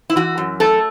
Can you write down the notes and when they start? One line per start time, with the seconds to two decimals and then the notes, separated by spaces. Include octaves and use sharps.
0.10 E4
0.16 E3 F#4
0.38 F#2
0.60 A3 A4